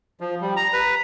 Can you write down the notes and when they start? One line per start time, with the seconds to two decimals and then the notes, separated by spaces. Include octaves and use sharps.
0.20 F3
0.41 G3
0.57 A#5
0.73 B4